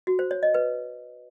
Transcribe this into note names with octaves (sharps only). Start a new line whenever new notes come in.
F#4
C5
C#5
D#5
B4